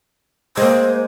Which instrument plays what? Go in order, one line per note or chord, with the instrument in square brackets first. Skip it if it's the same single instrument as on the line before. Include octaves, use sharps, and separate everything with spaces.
[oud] G#3 A#3 [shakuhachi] C5